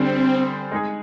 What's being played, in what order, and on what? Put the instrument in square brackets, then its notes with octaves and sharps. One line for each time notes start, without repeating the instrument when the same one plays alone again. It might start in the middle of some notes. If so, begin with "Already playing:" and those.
Already playing: [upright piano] D3 G3 D4 G#4 C5 [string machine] C4
[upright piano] G#3 D#4 G#4